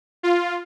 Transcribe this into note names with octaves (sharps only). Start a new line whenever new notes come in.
F4